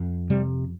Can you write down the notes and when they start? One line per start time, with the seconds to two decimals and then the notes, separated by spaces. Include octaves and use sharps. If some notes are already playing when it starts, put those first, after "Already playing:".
Already playing: F2
0.30 C3 G3